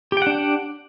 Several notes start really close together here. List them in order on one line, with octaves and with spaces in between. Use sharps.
G4 G5 F#5 D4 D5